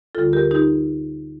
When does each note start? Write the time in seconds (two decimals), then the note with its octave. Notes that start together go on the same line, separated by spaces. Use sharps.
0.15 D2 D3 G3 F4 A4
0.33 G4 A#4
0.51 D#4 G4